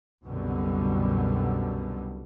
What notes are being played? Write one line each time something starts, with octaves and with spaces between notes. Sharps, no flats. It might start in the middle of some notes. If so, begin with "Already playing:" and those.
C2 F#2 B2 D3 G3